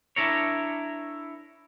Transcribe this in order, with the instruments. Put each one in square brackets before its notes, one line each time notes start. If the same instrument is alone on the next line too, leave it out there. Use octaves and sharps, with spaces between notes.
[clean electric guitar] D4 E4 A#4 C#5